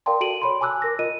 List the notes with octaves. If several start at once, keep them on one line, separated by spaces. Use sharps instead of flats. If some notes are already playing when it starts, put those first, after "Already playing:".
A#4 D5 F5 G5 A5 C6
F#4 A4 D7 D#7 F#7
C#5 B5 C6
G#5 A5 D6 E6 F#6
A#4 A#6
F4 A#4 D#5 D#7